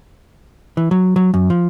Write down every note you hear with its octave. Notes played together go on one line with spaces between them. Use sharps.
E3
F#3
F#3
F#2
F3